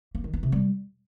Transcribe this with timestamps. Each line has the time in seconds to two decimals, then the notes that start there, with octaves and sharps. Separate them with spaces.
0.15 A#3
0.24 D#3
0.33 B3
0.43 C3
0.52 G3